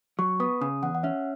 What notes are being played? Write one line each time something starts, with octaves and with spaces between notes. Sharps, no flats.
F#3 C#6
B3 D#6
C#3 D#6
E2 F#5
F#5
C#4 E5